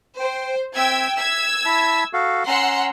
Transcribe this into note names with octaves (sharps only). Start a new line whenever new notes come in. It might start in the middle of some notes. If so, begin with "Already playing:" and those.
C5 G5
C4 E5 G5 E6 G#6
E5 E6 G#6
E4 E5 A5
F#4 A4 F5
C#4 F#5 A#5 C6 E6